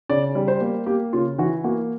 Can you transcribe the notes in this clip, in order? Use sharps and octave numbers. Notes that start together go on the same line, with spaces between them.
C#3 D5
G3
C5
A#3
A#3 G4
C#3 F4
E3 F#4
A#3 F#4